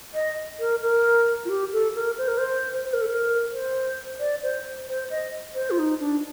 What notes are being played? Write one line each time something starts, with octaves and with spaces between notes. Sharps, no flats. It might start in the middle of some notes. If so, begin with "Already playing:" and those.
D#5
A#4
A#4
F4
G4
A4
A#4
C5
A#4
C5
C5
A#4
A4
A#4
C5
D5
C5
C5
D#5
C5
F4
D#4
D4